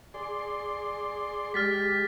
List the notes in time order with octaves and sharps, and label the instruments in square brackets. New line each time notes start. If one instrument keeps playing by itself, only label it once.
[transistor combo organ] G#4 D5 C6
[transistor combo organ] G#3 G4 [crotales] F6 A6 B6